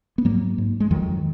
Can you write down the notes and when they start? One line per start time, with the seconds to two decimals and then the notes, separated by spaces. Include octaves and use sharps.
0.18 B3
0.25 G#2 F#3 A#3
0.58 G#2
0.80 G#3
0.91 F2 D#3 F#3